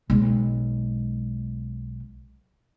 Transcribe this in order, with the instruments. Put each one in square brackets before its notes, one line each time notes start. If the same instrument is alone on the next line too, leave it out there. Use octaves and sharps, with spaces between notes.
[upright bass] B1 G#3